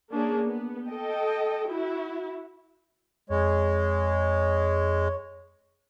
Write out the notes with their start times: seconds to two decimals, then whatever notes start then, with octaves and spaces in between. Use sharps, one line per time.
0.11 A#3 C#4 D4 G#4
0.44 B3
0.88 A4 D#5 G5
1.69 E4 F#4
3.30 F2 G#3 C#5